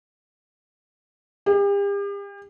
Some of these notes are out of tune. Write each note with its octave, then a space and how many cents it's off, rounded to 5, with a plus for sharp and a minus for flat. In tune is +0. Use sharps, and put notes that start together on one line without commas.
G4 +40